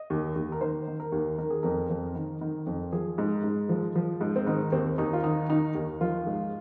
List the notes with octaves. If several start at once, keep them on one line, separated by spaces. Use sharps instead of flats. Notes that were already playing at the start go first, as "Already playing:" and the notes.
Already playing: D#5
D#2
D#2
A#4
D#3 C5
D#3
A#4
D#2
D#3 A#4
G#4
F2 A#4
F2
D#3
D#3
F2
F3 G#4
G#2
G#2
F3
F3
G#2
C4
D#3 D#4
D#2 C4
D#2 D#4
F4
D#3 D#4
D#3 D#4
D#2
F3 F4
G#2